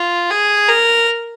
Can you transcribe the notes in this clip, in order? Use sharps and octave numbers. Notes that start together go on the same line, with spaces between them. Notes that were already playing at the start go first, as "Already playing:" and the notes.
Already playing: F4
G#4
A#4